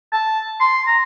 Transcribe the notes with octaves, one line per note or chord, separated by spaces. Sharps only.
A5
C6
A#5